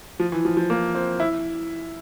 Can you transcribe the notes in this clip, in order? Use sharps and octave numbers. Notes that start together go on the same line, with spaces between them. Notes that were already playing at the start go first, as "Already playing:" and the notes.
F3
E3
F3
F3
A#3
C4
E4